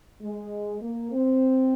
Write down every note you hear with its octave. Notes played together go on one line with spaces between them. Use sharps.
G#3
A#3
C4